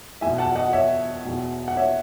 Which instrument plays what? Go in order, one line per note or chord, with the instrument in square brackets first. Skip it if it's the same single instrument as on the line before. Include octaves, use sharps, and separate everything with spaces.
[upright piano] E2 E5 G#5
B2
F#5 A5
D#5 F#5
C#5 E5
E2 B2
F#5
C#5 E5